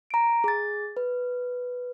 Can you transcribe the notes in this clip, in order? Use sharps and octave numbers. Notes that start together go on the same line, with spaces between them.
A#5 D7
G#4 A6
B4